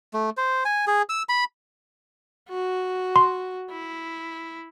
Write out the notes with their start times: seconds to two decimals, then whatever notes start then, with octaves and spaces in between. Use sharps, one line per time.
0.14 A3
0.37 C5
0.65 G#5
0.87 G#4
1.09 E6
1.29 B5
2.49 F#4
3.16 C6
3.71 E4